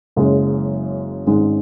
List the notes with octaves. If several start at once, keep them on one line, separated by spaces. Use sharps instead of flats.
F#1 F#2 C#3 G#3
G#1 G#2 G#3 C#4